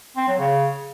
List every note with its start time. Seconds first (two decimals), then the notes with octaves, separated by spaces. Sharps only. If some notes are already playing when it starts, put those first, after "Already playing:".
0.16 C4
0.27 F#3
0.39 C#3